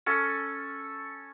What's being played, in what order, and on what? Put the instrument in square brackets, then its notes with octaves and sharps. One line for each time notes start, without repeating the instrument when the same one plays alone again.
[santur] C#4 A4